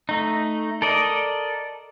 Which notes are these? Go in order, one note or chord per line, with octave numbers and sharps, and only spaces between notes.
A3 D#4
A4 A#4 D5 D#5